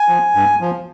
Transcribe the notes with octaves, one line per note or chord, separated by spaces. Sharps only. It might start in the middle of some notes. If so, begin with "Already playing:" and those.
Already playing: G#5
F3
G2
F3